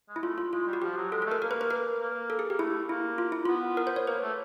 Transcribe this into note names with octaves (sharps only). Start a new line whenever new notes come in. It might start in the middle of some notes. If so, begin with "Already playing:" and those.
G#3
E4
A3 F4
F4
G#3 F4
G3
F#4
F3 G4
F#3
G#3 A4
A3 A4
A#4
A#3 A#4
B4
B4
A#4
A#3
A4
G#4
A#3 G4
A3 E4
A#3 E4
F4
E4
B3 F4
A#4
C5
C#5
A#3 B4
A3